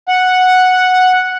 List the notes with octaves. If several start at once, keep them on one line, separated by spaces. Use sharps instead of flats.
F#5